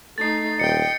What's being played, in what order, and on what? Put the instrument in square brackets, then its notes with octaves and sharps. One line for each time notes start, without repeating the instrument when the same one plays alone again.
[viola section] A3 D#4 [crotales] A6 C7
[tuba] D#1 [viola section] D#5 G5 [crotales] C#7